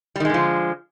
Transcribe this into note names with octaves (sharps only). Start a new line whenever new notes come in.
D3 D#3 F3 G3 G#3